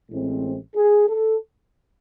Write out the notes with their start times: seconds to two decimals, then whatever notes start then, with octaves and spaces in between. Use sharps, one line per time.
0.11 A1 A2 G#3 C4
0.75 G#4
1.08 A4